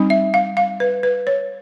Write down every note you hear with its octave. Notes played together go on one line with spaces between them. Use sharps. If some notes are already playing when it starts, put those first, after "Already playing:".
Already playing: G3 C4 D#4
E5
F5
F5
B4
B4
C#5